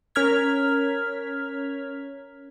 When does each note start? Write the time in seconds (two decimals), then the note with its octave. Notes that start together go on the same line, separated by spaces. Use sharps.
0.15 C#4 A#4 F6 G#6 B6